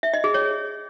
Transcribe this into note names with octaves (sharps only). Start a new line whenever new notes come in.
E5
D#5
G#4
C#5